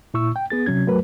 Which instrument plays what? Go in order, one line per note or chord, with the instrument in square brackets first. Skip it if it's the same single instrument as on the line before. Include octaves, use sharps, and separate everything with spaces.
[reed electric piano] A#2 E4 C#6 E6
G5
B3 G#4 A6
C3 F#3 C#4 G#6
F#3 A3 A#4 B4